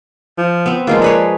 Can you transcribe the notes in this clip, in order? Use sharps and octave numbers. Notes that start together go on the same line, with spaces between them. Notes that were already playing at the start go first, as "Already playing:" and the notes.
F3
B3 C4
F3 G#3 A#3 F4
G#4 B4 C#5 D5